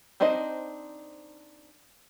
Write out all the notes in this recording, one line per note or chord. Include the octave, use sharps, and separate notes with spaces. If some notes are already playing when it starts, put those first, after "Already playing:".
C4 D4 D#4 C5 D#5